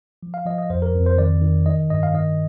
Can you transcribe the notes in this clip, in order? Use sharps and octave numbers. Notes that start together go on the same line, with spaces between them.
F3
F5
F3 D#5
D#5
F2 C5
A#4
F2
C5
D#3 D5
D#3
D#3 D#5
G2 D#5
F5
D#3 D#5